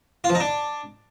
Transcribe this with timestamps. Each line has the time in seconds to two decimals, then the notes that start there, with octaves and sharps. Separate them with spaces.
0.24 F4
0.30 F3
0.35 D#4
0.40 D4